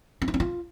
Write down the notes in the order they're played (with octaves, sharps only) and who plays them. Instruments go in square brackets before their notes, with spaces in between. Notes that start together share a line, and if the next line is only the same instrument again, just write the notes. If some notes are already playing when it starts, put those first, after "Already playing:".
[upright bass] C4
D#4
C#4
F4